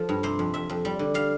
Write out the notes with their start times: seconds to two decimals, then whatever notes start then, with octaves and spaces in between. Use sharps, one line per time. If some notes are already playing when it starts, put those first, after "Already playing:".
Already playing: F3 A4
0.09 G2
0.23 C3 C5
0.39 F2
0.54 F2 E5
0.69 F2
0.85 G3
0.99 D3
1.14 G3 F5